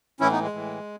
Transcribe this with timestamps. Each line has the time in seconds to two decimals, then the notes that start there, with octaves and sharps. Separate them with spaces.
0.20 A2 E3 C#4 E4
0.31 B3 D#4
0.42 G#3
0.53 A2 E3